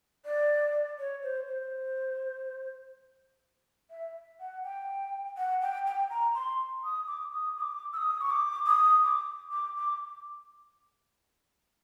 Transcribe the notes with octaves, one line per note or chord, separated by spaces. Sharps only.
D5
C#5
C5
C5
E5
F#5
G5
F#5
G5
G5
A#5
C6
D#6
D6
D#6
D#6
D6
E6
D#6
C#6
D6
D#6
D6
D6
D6